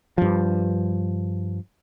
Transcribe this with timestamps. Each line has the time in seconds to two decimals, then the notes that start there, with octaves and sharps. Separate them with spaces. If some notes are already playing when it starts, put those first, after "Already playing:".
0.18 G2 F3